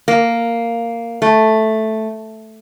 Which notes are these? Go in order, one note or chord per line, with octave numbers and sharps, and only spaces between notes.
A#3
A3